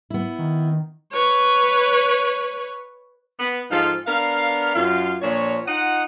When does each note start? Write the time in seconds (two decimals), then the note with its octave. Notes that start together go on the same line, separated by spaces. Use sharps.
0.10 B3 E4
0.39 D#3
1.12 B4 C#5
3.39 B3
3.71 G#2 F3 D#4 F4 A4 F5
4.06 B3 D4 A#4 F5
4.74 F#2 F4 F5
5.22 A#2 F3 D4 C#5
5.67 D#4 F4 D#5 F#5